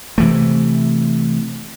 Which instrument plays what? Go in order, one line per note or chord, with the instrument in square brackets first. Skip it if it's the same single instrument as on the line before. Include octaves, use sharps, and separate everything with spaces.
[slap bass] C3 E3 A3